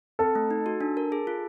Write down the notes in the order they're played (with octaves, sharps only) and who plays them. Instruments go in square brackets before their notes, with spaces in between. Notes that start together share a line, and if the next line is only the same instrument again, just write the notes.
[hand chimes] C4 [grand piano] A4
[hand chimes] A3
D#4
F#4
D4
A#4
G#4
F4